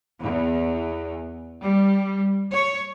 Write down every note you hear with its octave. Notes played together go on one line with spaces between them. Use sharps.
E2
G3
C#5